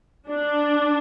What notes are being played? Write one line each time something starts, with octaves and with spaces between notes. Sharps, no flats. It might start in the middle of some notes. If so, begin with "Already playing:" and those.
D4